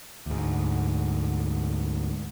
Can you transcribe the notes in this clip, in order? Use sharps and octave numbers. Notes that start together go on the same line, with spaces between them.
D2 G#2